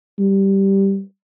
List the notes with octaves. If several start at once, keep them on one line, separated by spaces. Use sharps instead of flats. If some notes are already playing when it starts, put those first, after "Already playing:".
G3